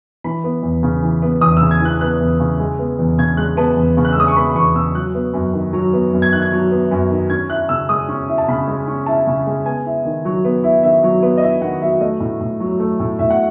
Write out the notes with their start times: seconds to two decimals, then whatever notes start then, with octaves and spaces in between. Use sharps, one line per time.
0.24 E3 B5
0.44 B3
0.63 E2
0.83 C#3
1.03 E3
1.22 B3
1.41 E2 D#6
1.57 C#3 E6
1.71 G#6
1.81 E3 F#6
2.01 B3 F#6
2.20 E2
2.40 C#3
2.60 G#3
2.79 B3
2.99 E2
3.18 C#3 G#6
3.37 G#3 F#6
3.57 B3 A5
3.77 E2
3.97 C#3
4.05 F#6
4.13 E6
4.16 G#3 D#6
4.28 C#6
4.36 B3 B5
4.50 B5
4.55 E2 C#6
4.75 C#3 E6
4.95 F#3 F#6
5.15 B3
5.34 F#2
5.53 D#3
5.73 F#3
5.93 B3
6.13 F#2
6.22 G#6
6.33 D#3 F#6
6.42 G#6
6.52 F#3
6.71 B3
6.91 F#2
7.11 D#3
7.30 C#4 G#6
7.49 E4 F#6
7.69 C#3 E6
7.89 G#3 D#6
8.09 C#4
8.28 E4
8.38 A5
8.48 C#3 B5
8.67 G#3
8.88 C#4
9.06 E4 A5
9.27 C#3
9.47 G#3
9.65 B3 G#5
9.86 E4
10.05 D#3
10.25 F#3
10.45 B3
10.64 E4
10.83 D#3 E5
11.03 F#3
11.23 B3
11.38 D#5
11.43 E4 E5
11.62 D#3 F#5
11.82 F#3 E5
12.01 A3 D#5
12.20 A2
12.41 A2
12.60 F#3
12.80 A3
13.00 A2
13.19 A2 E5
13.30 F#5